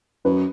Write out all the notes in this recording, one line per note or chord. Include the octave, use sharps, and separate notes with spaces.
F#2 B4